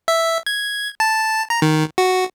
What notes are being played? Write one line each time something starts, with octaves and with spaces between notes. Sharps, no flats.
E5
G#6
A5
A#5
D#3
F#4